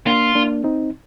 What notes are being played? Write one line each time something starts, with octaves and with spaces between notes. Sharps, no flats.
A#3 D4 F4
A#3 D4
C4 D#4